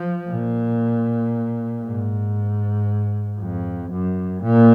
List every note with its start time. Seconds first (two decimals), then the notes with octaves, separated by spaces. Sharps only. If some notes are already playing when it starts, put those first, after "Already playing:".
Already playing: F3
0.29 A#2
1.84 G#2
3.40 F2
3.91 F#2
4.43 A#2